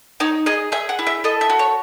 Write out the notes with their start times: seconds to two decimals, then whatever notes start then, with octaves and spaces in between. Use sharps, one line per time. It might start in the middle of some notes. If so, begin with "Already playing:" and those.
0.20 D#4 C#5
0.46 G#4 D#5
0.72 G#4 E5
0.89 F#5
0.99 E4
1.07 E5
1.24 A4 D#5
1.41 E5
1.49 F#4
1.59 C#5